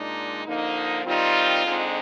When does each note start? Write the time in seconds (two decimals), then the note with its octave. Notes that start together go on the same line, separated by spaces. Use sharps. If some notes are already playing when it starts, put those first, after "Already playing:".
Already playing: A#2 G#3 D4 D#4
0.45 D3 F3 A#3 D#4
1.05 D#3 G3 C4 D#4 F4
1.63 D3 G#3 C4 D#4